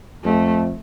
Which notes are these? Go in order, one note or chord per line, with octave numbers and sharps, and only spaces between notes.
F2 A3